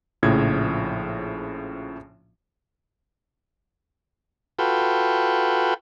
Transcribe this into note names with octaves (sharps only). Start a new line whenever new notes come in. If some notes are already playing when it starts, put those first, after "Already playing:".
A#1 A2 C#3 F3 G#6
F4 F#4 A4 B4 G5